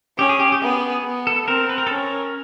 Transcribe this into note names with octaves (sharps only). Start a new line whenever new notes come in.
C#4 G4
G#4
G4
G4
B3 G#4
B3
A4
C4 A#4
B4
A#4
A4
C#4
A#4